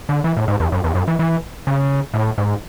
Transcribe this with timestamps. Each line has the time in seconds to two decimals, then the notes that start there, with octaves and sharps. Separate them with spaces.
0.09 D3
0.24 E3
0.37 A2
0.48 G#2
0.60 E2
0.72 F#2
0.84 E2
0.95 F#2
1.08 E3
1.19 E3
1.67 C#3
2.14 A2
2.38 G#2